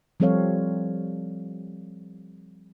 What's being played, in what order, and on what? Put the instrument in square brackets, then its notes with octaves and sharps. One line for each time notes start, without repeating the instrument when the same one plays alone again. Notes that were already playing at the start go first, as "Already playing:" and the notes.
[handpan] F3 G3 C4 A4 C#5 F5